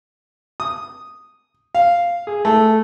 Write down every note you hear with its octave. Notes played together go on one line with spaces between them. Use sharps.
D#6
F5
G#4
A3